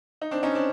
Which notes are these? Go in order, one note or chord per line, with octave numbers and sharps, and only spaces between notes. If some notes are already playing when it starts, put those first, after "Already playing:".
D#4
C4 D4
C#4 D#4
C4 D4